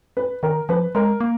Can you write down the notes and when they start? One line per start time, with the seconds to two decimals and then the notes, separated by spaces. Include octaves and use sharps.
0.17 B4
0.43 D#3 A#4
0.69 F3 B4
0.95 G#3 A#4
1.21 A#3